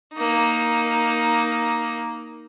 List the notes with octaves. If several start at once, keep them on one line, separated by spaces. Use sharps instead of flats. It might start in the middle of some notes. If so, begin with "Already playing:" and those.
A#3 D#4